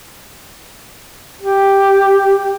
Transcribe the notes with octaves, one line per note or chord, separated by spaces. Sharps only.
G4